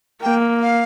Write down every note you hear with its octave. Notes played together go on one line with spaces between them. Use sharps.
A#3 G5
F5